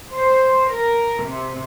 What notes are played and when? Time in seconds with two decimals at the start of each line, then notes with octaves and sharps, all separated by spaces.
0.13 C5
0.70 A#4
1.23 C3